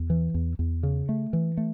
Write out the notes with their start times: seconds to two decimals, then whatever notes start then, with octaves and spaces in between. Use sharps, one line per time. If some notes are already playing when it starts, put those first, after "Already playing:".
Already playing: E2
0.10 E3
0.34 E2
0.59 E2
0.83 C#3
1.09 A3
1.33 E3
1.57 A3